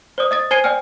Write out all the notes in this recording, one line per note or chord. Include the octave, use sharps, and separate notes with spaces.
C5 D5 D#6
D#5 D#6 A6
C5 G#5 G#6 C7 D#7 G7
D5 G5 G#5 F6